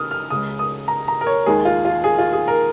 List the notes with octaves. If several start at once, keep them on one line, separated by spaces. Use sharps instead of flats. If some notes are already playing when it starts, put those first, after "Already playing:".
Already playing: C#3 D#6 F6
F6
C#2 C#3 G#3 D#6
D#6
A#5
A#5
A#4
C#5
D#2 D#3 G#3 G#4
F4
F4
G#4
F4
G#4
A#4